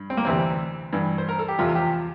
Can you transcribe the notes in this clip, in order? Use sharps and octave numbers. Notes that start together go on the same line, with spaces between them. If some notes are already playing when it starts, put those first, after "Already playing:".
Already playing: G2
C4
A#3
D2 C3 E3 C4
G2 E3
C5
A#4
A4
G4
E2 C3 F3 F4
F4
G4